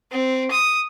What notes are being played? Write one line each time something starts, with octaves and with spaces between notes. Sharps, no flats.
C4
D#6